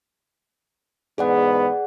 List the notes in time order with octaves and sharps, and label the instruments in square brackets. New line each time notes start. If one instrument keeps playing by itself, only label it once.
[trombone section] E2 G#2 B3 [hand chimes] G#4 D5 F#5